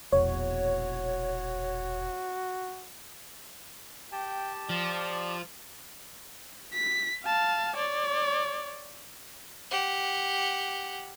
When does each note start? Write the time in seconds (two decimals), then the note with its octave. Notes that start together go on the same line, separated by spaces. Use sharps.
0.12 E1 A#1 F#4 C#5
4.12 G4 G5 A5
4.69 F3 D5
6.73 B6
7.25 F5 A5
7.77 C#5 D5
9.71 G4 F#5